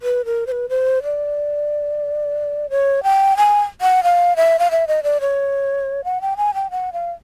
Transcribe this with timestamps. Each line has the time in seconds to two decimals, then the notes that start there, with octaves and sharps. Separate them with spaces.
0.02 B4
0.25 A#4
0.47 C5
0.52 B4
0.69 C5
1.03 D5
2.70 C#5
3.03 G5
3.37 G#5
3.81 F#5
4.04 F5
4.36 E5
4.59 F5
4.71 E5
4.88 D#5
5.03 D5
5.21 C#5
6.04 F#5
6.21 G5
6.37 G#5
6.54 G5
6.71 F#5
6.93 F5